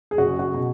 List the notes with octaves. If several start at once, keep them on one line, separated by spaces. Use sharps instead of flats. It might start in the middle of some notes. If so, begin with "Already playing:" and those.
G#4
F#1 F#4
F#4
B2